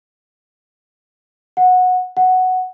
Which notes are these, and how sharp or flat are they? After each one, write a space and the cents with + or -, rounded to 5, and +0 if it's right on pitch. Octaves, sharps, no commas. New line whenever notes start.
F#5 -15
F#5 +0